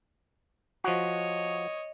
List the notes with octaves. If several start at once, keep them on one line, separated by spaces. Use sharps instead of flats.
F3 F#4 C#5 D#5